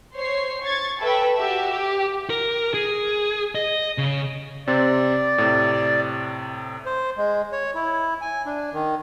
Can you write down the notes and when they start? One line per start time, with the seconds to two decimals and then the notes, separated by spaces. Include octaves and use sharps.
0.14 C5 C#5 C7
0.63 C#6 G#6 A6
0.99 A4 B4 E5 G5
1.37 F#4 G4 E5
1.72 G4
2.30 A#4
2.74 G#4
3.55 D#5
3.98 C#3
4.67 C3 C4 D5
5.38 A2 C3
6.86 C5
7.17 G#3
7.52 C#5
7.75 E4
8.21 G#5
8.46 D4
8.73 D#3